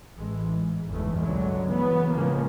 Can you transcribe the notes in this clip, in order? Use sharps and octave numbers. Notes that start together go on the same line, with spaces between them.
A1 E3 G#3
G#2
G1 E2 G#2 G#3 A3
G1 C#2 D3 F#3 G#3
C#3 E3 B3
A2 C#3 F3 G#3 A#3